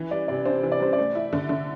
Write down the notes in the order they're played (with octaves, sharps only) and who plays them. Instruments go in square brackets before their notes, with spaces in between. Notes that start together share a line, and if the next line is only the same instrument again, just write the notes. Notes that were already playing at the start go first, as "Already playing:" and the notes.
Already playing: [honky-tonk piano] E3
[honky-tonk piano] G3 [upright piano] D5
[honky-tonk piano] C3 [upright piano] D5
[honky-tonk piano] D4 [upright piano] C5
[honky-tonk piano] E3
[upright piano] D5
[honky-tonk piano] G3 [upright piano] C5
[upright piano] D5
[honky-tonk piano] A3
E4
D3
D3